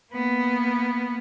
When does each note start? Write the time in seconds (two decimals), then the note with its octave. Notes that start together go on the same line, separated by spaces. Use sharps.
0.12 A#3 B3